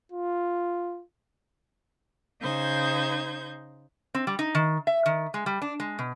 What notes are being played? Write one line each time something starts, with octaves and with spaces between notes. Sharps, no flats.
F4
C#3 D#4 C5 G6 G#6
C4
G3
D#4
D#3
E5
D#3
G#3
G3
D4
G#3
B2